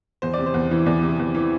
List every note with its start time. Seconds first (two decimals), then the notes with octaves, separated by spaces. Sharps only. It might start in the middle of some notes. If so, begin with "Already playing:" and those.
0.22 E2 C5
0.34 C3 D5
0.46 C5
0.54 E2
0.71 E3
0.86 E2 D5
1.03 C3
1.19 E2
1.34 E3